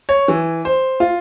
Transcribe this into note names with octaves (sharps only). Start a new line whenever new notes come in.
C#5
E3
C5
F4